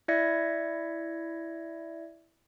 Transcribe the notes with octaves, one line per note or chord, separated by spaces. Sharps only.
E4 D5 E5 G#6 A#6 C#7